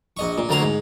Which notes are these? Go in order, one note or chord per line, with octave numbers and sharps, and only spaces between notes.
A#1 D#5 C#6
A#2
D2 F#3 A#3 A#5 C6
G#2